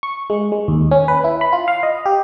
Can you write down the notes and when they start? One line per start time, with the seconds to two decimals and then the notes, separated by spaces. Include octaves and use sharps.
0.03 C#6
0.30 G#3
0.52 G#3
0.68 D#2
0.91 C#4
1.08 B4
1.24 E4
1.41 B5
1.53 F4
1.68 F5
1.83 D#5
2.06 G4